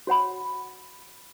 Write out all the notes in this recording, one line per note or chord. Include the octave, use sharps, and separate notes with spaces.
F#4 C#5 F#5 B5